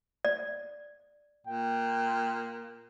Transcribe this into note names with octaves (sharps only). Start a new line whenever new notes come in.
D5
A#2 G5